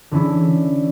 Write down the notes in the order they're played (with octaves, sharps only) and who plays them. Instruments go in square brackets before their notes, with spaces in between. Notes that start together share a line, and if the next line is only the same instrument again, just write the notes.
[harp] D3 E3 C#4 E4